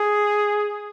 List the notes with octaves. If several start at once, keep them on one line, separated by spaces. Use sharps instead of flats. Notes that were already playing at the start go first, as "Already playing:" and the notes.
Already playing: G#4